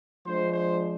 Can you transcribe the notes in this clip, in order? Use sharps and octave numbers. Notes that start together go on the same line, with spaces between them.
F3 G#3 D4 C5
C5